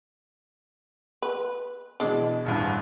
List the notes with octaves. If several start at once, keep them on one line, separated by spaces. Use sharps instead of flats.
B4
B2 E3 G#3 D4
D#1 A1 G2